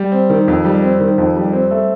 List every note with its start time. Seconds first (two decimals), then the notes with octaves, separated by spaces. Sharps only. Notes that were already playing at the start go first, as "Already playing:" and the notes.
Already playing: G3
0.12 C4
0.30 D#3
0.48 F2
0.65 G3
0.82 C4
1.00 D#3
1.18 F2
1.36 G3
1.53 C4
1.71 A3